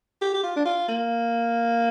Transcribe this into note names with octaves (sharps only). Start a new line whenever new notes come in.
G4
G4
F4
D4
F4
A#3